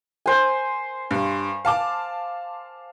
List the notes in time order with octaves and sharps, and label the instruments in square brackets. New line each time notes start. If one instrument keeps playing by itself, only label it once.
[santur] C5 G#5
[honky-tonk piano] G2
F5 A5 D6